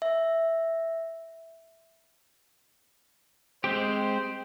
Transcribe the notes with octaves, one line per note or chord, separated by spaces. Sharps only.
E5
G#3 C4 G4 C5